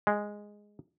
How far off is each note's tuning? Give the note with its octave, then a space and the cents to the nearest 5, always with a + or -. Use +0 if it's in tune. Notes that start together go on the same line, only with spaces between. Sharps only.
G#3 -5